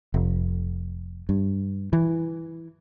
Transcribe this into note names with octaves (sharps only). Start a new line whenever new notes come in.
F1
G2
E3